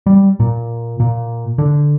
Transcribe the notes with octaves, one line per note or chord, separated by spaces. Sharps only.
G3
A#2
A#2
D3